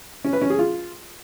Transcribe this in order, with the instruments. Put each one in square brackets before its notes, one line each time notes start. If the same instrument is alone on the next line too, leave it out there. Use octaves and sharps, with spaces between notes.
[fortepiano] C#4
B4
C#4
G#4
F4